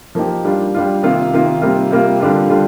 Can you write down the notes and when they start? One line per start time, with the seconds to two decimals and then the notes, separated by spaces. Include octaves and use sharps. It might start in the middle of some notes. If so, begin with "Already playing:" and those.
0.15 F3 A#3 D#4 G4
0.45 G3 D4 F4
0.74 G3 D4 F4
1.03 C3 D#3 A#3 F4
1.33 C3 D#3 A#3 F4
1.62 C3 G3 A#3 F4
1.91 C3 G3 A#3 F4
2.20 D3 G3 D4 F4
2.49 D3 G3 D4 F4